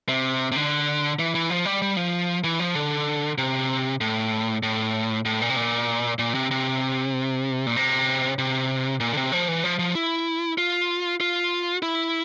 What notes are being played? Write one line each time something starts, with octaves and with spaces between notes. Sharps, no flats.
C3
C3
D3
E3
E3
F3
G3
G3
F3
E3
F3
D3
C3
A2
A2
A2
A#2
C3
A#2
A#2
C3
C3
A#2
C3
C3
A#2
D3
C3
F3
E3
F3
F3
E4
F4
F4
E4